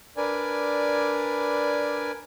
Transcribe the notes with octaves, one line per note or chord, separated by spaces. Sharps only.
D4 A#4 B4 D5 G#5